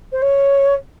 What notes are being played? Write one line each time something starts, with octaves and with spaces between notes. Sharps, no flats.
C5
C#5